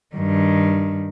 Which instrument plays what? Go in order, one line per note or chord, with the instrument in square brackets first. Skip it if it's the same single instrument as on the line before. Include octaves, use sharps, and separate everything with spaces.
[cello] G2 D#3